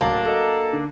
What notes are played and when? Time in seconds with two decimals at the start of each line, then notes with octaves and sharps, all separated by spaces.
0.01 D1 F#3 A#3 D4 A5
0.25 F#4 A4 D#5
0.73 D3